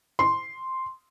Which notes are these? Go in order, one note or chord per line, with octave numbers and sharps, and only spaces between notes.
C6